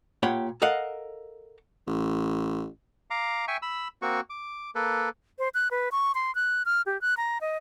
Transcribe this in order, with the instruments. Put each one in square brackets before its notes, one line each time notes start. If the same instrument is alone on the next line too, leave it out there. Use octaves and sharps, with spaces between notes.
[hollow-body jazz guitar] A#2 G4 C#5 F#5 G5 B5
A4 A#4 D#5 F5 F#5
[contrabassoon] A1
[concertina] F5 A#5 D6
E5 G5 G#5 C#6
B5 E6
A#3 C4 F#4 C#6
D6
A#3 A4 B4
[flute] C5
F#6
B4
C#6
C6
F#6
F6
G4
F#6
A#5
D#5